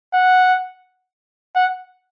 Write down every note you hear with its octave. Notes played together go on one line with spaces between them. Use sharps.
F#5
F#5